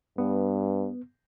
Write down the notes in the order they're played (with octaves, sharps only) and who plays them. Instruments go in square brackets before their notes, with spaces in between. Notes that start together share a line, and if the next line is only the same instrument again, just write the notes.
[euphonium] G2 [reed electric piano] B3